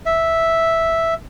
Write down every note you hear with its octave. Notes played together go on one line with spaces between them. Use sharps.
E5